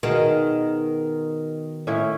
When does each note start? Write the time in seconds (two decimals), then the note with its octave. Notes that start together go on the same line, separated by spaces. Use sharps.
0.03 B2 D#3 G#4 F5
1.87 A2 C#4 E4